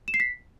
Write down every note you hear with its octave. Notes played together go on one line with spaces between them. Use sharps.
E7
C7
B6